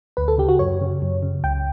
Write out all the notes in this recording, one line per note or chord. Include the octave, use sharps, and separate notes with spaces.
D2 B4
A4
C#3 G4
F#4
F#2 C#5
C#3
F#2
C#3
C#2 G5